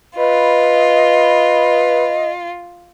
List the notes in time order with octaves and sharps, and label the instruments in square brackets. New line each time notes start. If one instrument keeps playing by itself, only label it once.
[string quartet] F4 [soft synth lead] B4 [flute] D#5